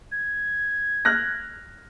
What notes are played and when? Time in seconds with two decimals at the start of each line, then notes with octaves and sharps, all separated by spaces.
0.12 G#6
1.05 F6 F#6 A#6